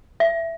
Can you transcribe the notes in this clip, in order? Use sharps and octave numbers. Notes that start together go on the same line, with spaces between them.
E5